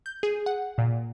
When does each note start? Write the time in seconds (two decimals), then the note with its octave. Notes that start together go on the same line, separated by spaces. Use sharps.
0.06 G6
0.23 G#4
0.46 F#5
0.78 A#2